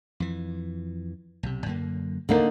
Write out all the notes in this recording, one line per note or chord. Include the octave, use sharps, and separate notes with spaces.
F2 E3
B1 C3
F#2 D3 A#3
D#2 D3 G3 A#3 D4 D#4